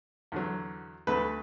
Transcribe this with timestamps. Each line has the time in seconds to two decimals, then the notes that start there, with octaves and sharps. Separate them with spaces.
0.32 E2 D3 F#3
1.07 D2 D3 A3 B4